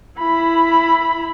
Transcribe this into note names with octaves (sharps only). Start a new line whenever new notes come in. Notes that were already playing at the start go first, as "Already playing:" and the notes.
E4 B5